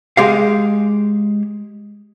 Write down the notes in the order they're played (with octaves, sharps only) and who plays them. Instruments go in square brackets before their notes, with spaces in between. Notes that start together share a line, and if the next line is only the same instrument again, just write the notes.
[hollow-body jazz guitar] G#3 G4 F5